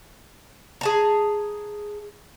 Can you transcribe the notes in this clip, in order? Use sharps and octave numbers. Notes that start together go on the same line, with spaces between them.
G#4 A5 A#5